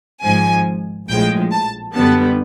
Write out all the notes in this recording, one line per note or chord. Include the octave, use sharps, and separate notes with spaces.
G#1 G#2 F3 G#5
A#1 A2 F3 G#3 G5
A5
F#2 D3 G3 B3 A5